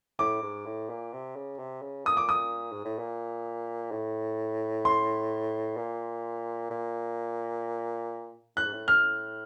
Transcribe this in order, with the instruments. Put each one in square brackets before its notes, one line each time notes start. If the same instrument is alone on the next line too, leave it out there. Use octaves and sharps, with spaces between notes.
[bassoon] A2 [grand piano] D6
[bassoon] G#2
A2
A#2
C3
C#3
C3
C#3
[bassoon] A#2 [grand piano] D#6
[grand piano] D6
D#6
[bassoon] G#2
A2
A#2
A2
[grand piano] C6
[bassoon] A#2
A#2
[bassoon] A2 [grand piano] F#6
[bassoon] G#2
A2
[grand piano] F6